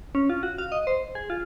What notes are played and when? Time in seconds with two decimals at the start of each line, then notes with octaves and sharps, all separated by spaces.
0.15 C#4
0.30 F4
0.43 F#4
0.58 F5
0.72 D#5
0.87 C5
1.15 G#4
1.30 F4